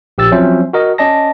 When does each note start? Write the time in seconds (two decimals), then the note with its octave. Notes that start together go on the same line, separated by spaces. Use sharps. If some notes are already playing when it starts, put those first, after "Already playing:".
0.18 A#1 G4 E6 A6
0.32 F3 F#3 C4 C#4 C5 E5
0.73 F#4 A#4 D#5
0.98 C#4 D5 D#5 A5 A#6